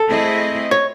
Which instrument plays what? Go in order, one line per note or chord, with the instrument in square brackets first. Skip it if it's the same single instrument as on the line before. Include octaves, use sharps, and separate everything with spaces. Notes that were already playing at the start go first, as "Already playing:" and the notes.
Already playing: [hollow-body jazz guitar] A4
[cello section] A3 C4 E4 G#4 D#5
[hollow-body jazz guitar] C#5